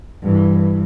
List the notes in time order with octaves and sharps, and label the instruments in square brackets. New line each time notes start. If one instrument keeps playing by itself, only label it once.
[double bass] G2 E3